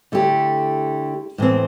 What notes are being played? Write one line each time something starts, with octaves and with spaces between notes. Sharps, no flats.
D3 A3 E4 G4
A2 E3 C4